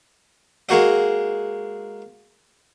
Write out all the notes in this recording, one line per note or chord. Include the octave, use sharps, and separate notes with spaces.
G#3 A#3 F#4 D#5